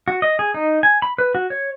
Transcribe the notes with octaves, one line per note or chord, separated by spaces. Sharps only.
F#4
D#5
G#4
D#4
G#5
B5
B4
F#4
C#5